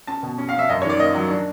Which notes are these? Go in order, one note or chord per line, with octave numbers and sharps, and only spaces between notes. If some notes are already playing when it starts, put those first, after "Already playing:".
C#4 A5
B2
C#4
F5
C#4 E5
F#2 D#5
C#5
D#3 D5
A#3 D#5
F#3
D4